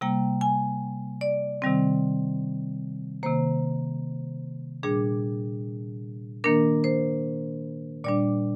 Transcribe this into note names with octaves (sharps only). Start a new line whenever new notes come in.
C3 G3 A#3 G5
G#5
D5
C3 D#3 G3 C4
C3 D#3 A#3 C5
A#2 G3 D4 G#4
D#3 A#3 D4 A#4
C5
A#2 G3 D4 D5